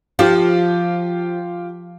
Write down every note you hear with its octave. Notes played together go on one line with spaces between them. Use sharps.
F3 F4 G4